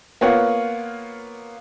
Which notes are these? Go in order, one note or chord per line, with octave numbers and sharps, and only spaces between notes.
A#3 B3 F4 C#5 F#5